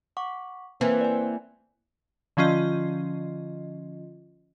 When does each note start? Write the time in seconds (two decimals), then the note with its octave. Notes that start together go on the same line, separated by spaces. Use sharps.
0.17 F#5 C#6 D6
0.81 E3 A#3 C4 B4 G#5
1.01 D5 G#5
2.37 D3 F3 C#4 F4 D#5